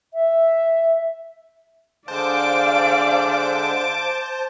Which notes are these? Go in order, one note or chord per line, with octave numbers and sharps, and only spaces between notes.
E5
D3 G#3 C5 D5 F5 A5 D6